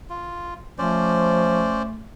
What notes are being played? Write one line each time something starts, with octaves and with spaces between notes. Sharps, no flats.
F4
F3 A3 C#4 C5 D5